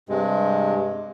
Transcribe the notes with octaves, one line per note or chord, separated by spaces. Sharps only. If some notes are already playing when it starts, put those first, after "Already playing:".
G2 C3 G#3